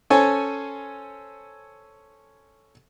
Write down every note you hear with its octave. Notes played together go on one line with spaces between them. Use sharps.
C#4 A4 C5 C#5 G#5